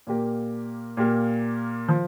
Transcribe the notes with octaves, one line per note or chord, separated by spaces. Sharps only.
A#2 A#3 G4 A#4
A#2 A#3 G4 A#4
F3